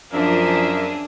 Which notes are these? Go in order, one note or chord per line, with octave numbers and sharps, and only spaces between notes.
F#2 F3 A#3 D4 G#4 A#4 E5